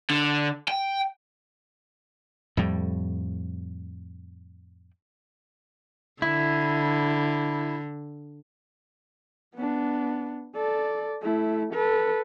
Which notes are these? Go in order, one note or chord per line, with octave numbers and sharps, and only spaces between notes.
D3
G5
F2 A2 G3
D3 E4
B3 D4
A4 D5
A3 E4
A4 B4